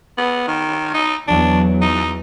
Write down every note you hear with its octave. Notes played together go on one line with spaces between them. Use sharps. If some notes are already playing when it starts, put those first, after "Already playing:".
B3
D#3
D#4
E2 F#3 D4
D#4